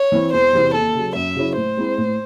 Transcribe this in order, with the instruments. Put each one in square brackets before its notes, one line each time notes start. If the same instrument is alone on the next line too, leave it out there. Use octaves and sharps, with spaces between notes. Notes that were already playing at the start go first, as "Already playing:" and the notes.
Already playing: [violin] C#5
[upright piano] E3 C4 E4
[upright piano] E1 [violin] C5
[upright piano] E2 C3 E3 C4
[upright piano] D#2 [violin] A4
[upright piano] C#3 F#3
[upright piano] F#2 [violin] E5
[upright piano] C#3 F#3 C#4 E4
[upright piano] A2 [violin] C5
[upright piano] G#3 C4 E4
A2